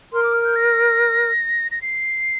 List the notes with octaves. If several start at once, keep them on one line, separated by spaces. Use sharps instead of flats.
A#4 C6
D6
F6
G6
A#6
A#6
C7